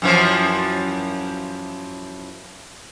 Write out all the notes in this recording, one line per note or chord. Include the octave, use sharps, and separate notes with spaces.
F#2 E3 F3